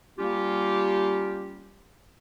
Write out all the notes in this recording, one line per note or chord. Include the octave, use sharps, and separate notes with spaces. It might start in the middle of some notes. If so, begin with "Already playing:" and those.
G3 A#3 C#4 F4 G4